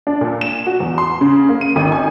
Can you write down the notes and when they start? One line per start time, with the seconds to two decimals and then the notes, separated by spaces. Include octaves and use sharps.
0.07 D4
0.21 A#2
0.41 E7
0.67 F#4
0.80 E2
0.98 C6
1.21 C#3
1.49 A#3
1.61 D#7
1.76 G#1
1.92 G#5